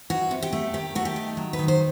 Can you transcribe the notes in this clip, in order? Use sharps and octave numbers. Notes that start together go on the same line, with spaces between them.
E3 F#4
C3
G4
A3
D#3 G4
A3 F#4
G4
D#3
F#3
B4
D#3
C5